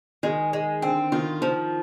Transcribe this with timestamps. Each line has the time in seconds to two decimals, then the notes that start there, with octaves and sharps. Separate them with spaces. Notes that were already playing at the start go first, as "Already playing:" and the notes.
0.23 D#3 G#3
0.53 G#3
0.82 D3 C4
1.12 D#3 F4
1.41 D#3 F3